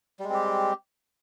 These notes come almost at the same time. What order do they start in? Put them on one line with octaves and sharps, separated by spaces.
G3 G#3 C4 G4